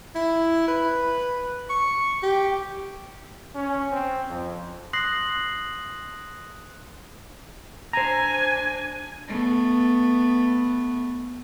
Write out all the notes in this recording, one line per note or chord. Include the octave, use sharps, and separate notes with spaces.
E4
B4
C#6
G4
C#4
C4
F2
C6 D#6 F#6 A#6 C7 F#7
D4 C5 G#5 A#5
A3 B3